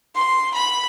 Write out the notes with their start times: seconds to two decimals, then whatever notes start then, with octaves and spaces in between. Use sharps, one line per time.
0.15 C6
0.55 B5